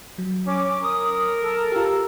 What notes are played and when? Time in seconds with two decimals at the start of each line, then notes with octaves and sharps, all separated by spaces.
0.18 F#3
0.47 C#4 D6
0.83 A#4 D#6
1.40 A4
1.72 F4 G4